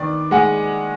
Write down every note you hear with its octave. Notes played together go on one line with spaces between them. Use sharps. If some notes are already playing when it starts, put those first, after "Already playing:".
Already playing: D#3 B3 D5
G#3 F#5 G#5